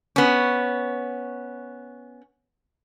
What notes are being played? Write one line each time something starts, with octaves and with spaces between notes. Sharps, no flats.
B3 C#4